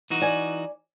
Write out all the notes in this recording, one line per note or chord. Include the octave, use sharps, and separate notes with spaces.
E3 D#4 F#4
D5 G#5